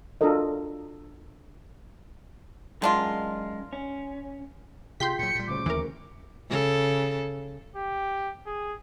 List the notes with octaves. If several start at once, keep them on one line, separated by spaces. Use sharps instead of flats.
D4 F4 F#4 A4 A#4 D#5
F#2 D#3 G#3 D4 F4
C#4
C3 F4 G#4 G5 C6 G6 B6
A#2 F#3 C#7
A#2 G3
D2 C#3 C5 D6
D#2 E3 A#4
C#3 A4
G4
G#4